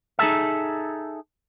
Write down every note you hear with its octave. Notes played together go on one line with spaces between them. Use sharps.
D#4 G#4 A4 E5